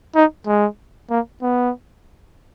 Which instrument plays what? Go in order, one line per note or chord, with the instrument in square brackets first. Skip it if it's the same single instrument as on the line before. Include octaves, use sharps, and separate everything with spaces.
[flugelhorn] D#4
G#3
A#3
B3